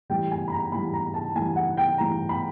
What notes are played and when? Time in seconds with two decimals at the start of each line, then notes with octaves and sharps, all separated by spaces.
0.09 A2 E3 G3 G5
0.31 G#5
0.48 B5
0.52 A#5
0.72 A2 E3 G3 B5
0.94 A#5
1.14 A5
1.35 A2 E3 G3 G#5
1.56 F#5
1.77 G5
1.98 A2 E3 G3 A#5
2.29 B5